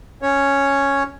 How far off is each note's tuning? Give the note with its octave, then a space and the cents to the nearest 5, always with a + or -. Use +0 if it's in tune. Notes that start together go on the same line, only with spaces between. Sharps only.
C#4 +0 C#5 +0